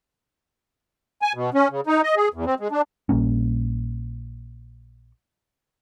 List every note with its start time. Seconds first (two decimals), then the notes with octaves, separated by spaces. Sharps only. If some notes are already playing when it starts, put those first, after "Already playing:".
1.22 G#5
1.35 B2
1.54 C#4
1.70 C#3
1.87 D#4
2.03 D#5
2.16 G#4
2.34 E2
2.46 C4
2.60 G#3
2.71 D4
3.09 A#1 G3 A#3 C#4